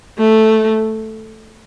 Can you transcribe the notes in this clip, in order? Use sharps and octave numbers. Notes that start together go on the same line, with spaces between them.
A3